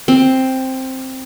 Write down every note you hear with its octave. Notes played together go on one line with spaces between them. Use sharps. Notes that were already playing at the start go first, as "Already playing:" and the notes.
C4